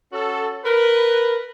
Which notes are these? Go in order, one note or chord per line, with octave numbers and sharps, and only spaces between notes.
C#4 F#4 A4
A#4 B4